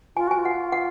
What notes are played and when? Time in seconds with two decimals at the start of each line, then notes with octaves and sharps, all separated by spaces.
0.16 F4 G#5
0.28 F#4 G#5
0.38 F4
0.45 F#5
0.72 F#5